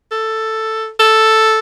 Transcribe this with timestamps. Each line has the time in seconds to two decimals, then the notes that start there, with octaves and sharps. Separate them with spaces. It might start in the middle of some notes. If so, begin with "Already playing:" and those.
0.12 A4
0.99 A4